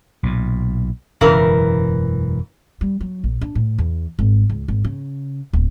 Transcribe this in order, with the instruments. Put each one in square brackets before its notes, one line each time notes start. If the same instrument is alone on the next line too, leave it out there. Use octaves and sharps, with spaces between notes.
[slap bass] B1 A#2
[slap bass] E1 F#2 [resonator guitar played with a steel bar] C#3 E3 A#4
[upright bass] G3
F#3
A#1
D4
A2
E2
G#1
C#2
G#1
C#3
D1